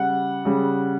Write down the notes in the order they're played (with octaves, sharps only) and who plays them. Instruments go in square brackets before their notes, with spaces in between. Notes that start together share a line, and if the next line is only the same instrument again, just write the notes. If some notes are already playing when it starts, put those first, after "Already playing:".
Already playing: [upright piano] C#3 G3 F#5
C#3 G3